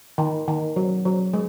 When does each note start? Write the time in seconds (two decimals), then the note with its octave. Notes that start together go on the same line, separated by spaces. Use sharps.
0.18 D#3
0.48 D#3
0.76 F#3
1.05 F#3
1.34 G#3